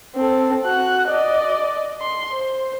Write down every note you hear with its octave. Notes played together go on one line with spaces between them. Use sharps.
C4 A4
F#4 F#6
D5 D#5
C6
C5